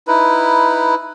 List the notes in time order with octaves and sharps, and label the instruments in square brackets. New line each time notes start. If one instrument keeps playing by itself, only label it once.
[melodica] D#4 E4 B4